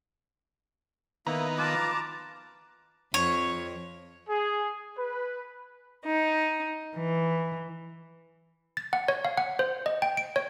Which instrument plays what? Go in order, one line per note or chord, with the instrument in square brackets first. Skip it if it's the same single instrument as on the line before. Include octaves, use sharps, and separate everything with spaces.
[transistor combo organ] D#3 B3 [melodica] A#3 E4 [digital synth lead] A#5
[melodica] F4 B4 [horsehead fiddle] A5 A#5 [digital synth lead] D6
[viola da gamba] F2 [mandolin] C#5
[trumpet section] G#4
B4
[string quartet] D#4
E3
[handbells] A6
F#5
C#5
F5
F#5
C5
D#5
G5
D7
C#5